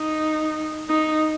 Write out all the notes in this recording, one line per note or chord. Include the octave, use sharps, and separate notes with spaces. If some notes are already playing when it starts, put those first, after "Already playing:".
Already playing: D#4
D#4